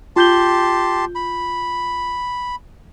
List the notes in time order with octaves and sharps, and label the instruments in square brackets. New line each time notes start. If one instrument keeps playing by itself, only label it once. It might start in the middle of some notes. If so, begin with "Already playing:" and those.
[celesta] F4 G6 G7 [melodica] G4 A5 C6
[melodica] B5